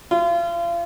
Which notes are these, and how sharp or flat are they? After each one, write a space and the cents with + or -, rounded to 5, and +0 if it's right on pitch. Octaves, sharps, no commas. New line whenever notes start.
F4 -35